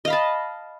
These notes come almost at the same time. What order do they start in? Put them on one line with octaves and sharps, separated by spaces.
D#5 F5 B5 A5